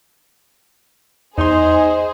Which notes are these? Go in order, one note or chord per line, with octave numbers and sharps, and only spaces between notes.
E2 D#4 G#4 C5 D#5 C6